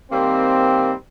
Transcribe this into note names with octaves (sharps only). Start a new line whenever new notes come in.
D#3 G3 A#3 C4